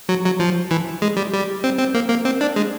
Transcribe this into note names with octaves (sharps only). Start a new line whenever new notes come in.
F#3
F#3
F3
E3
G#3
G3
G3
C4
C4
A#3
A#3
C4
D4
G#3